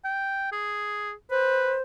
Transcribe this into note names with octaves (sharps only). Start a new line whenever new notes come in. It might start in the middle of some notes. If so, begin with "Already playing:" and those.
G5
G#4
B4 C5